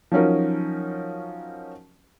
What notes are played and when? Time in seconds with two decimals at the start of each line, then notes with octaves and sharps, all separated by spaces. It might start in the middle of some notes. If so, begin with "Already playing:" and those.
0.12 F3 F#3 C#4 D#4 A#4